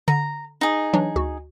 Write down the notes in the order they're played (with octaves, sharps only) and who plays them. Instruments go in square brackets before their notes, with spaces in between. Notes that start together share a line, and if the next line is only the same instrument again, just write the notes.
[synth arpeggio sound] D3 [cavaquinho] A#5
[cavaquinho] D#4 G#4
[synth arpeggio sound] E3 F#3 D4
D2 F#4